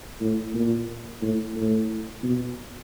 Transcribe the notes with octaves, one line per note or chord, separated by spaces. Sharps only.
A2
A#2
A2
A2
B2